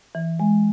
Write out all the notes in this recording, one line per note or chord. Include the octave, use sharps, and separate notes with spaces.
E3
G#3